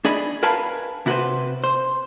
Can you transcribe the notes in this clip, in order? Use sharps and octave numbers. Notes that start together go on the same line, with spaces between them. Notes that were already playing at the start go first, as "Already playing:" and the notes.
D4 G#4 D5 D#5 B5
A#4 B4 F5 G#5 A5 B5
C3 E4 F#4 A4 B4 C5
C5